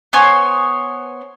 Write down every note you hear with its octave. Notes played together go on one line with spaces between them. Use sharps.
B3 C5 C#5 G#5